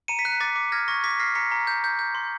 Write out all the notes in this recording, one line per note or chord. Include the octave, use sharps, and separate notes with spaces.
A#5 C#7 D#7
B6 C#7
F#6
D6 A6 B6
D6
F6 G#6 A#6
C#6 G#6 A#6
D6 A6 B6
F6 A#6 C7
A#5 B6 C#7
A#5
G6
G6
G6
C6